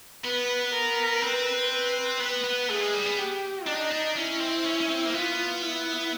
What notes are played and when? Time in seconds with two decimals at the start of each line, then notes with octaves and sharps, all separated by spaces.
0.24 B3 B4
0.74 A#4
1.22 C4 B4
1.71 B4
2.20 B3 B4
2.44 B3
2.69 A3 G#4
2.81 G#3
2.94 G3
3.06 B3
3.18 G4
3.66 D4 D#4
3.91 D4
4.15 C#4 E4
4.40 C4
4.64 C#4
4.80 C#4
4.89 C4
5.05 A#3
5.13 B3 F4
5.62 E4